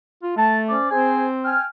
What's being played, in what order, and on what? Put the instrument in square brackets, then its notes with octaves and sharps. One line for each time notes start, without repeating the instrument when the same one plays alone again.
[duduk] F4
[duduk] A3 [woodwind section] A5
[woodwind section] C#4 C5 D5
[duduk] C4 [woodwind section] G#4 C5 G#5
[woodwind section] G5 G#5 F6